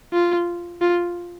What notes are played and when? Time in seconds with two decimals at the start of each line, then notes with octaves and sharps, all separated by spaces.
0.13 F4
0.82 F4